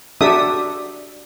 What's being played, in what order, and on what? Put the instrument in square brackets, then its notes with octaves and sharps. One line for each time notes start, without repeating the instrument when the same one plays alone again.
[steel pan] D4 F#4 G4 A4 E5 D#6